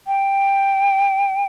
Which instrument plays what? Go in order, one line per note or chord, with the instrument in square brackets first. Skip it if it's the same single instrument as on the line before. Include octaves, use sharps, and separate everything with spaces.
[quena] G5